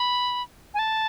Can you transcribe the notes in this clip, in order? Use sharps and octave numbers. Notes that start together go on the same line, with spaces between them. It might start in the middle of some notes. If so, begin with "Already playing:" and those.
Already playing: B5
G#5
A5